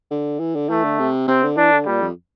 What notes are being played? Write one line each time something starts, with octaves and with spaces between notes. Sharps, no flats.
D3
E3
D3
E3 A3
D3
C3
C3 C4
D3
E3 D4
D3
A#2 G3
F2